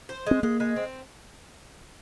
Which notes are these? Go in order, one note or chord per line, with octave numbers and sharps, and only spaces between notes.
C5
G#3 C4
G#3 A#3
G#3
C4